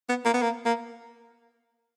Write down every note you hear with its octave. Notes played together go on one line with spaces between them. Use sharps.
B3
A#3
B3
A#3
A#3